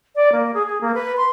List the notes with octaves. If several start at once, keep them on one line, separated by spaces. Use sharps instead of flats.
D5
A#3
G#4
G#4
A#3
B4
C6